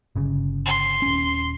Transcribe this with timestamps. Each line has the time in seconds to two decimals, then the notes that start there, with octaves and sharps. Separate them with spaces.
0.16 G1 C#3
0.65 C6
1.02 D#1 C#4